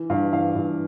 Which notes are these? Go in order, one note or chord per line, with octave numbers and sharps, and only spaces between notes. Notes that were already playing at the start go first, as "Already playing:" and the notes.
Already playing: E3
G2 F5
E3 F5
G2